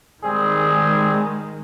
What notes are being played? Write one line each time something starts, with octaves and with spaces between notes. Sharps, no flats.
D#3 G3 G#3 C4 G#4